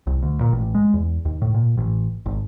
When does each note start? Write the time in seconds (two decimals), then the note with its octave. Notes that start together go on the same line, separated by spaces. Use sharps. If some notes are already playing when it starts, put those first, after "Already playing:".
0.07 C2
0.23 D2
0.41 A#2
0.52 A1
0.75 G#3
0.94 E2
1.25 D#2
1.42 A2
1.54 A#2
1.77 A1
2.26 G#1